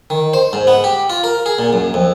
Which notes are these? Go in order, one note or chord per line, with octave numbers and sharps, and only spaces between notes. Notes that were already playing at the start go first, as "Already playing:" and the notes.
D#3
C5
G#2
B3
G4
F4
A#4
G#4
A#2
F#2
F2